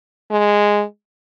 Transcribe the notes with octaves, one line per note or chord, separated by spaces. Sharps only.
G#3